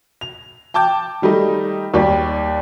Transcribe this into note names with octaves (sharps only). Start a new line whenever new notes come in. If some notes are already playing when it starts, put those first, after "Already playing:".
F7
G5 A5 D6 G6
D#3 G3 A3 D#4
D#2 G3 G4 D5